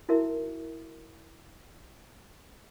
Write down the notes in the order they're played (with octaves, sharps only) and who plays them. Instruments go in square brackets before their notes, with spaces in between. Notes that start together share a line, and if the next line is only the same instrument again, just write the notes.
[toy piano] D#4 E4 F#4 A#4 E5